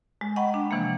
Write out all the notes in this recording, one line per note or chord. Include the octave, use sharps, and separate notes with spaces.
G#3
D#5 F#5 G5 A#5 B5 C#6
D4
C3 E3 F3 G#3 A#3